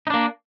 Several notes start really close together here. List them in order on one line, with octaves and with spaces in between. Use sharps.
D#4 D4 A#3